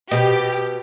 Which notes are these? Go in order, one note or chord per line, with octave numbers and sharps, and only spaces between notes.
B2 G4